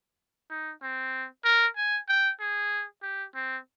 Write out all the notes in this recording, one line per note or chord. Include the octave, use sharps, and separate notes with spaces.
D#4
C4
A#4
G#5
G5
G#4
G4
C4